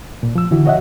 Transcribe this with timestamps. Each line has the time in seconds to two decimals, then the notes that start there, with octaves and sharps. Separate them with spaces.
0.23 A#2
0.35 F3 E6
0.51 D3 E3 E4 F#4
0.66 F#4 C#5 D#5 E5 F#5